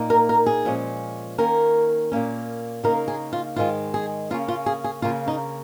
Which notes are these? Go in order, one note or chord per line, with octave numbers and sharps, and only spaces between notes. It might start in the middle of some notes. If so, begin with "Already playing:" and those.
Already playing: A#2 A#3 D#4
A#4
A#4
G#4
A#2 F3 G#3 C#4
D#3 A#3 C#4 A#4
A#2 A#3 C#4
C#3 A#3 D#4 A#4
G#4
F4
G#2 D#3 G#3 F4
G#4
C#3 A#3 C#4 F4
F4
G#4
G#4
C#3 A#3 C#4 F4
D#4